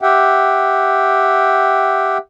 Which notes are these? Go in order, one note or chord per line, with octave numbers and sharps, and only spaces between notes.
G4 E5 F#5 G5